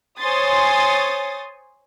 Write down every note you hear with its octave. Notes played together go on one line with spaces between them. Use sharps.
C5 C#5 G#5 C6 D#6 A6